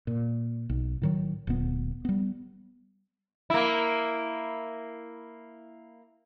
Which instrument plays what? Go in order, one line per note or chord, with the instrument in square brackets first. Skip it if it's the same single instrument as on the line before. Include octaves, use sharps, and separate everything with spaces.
[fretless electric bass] A#2
B1
A2 D#3 F#3
D1 A#2 B3
G3 B3
[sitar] A#3 E4